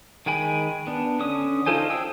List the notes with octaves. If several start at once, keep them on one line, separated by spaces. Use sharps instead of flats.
D#3 G#3 G5 G#5 B5
B3 D4
D3 C#4 D#6
D#4 F4 A4 C5 G#5
G#4 G5 D#6 E6